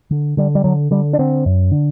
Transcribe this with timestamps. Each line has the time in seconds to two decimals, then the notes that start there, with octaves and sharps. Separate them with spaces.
0.11 D3
0.37 D3 G3
0.55 G3
0.64 D3 F#3
0.91 D3 G3
1.13 D4
1.19 D3 C4
1.46 F#2
1.72 D3